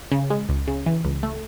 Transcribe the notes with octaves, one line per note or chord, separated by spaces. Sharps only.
C#3
G#3
C#2
C#3
E3
C#2
A3